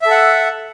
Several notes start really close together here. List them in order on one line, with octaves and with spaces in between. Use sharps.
E5 A4 F#5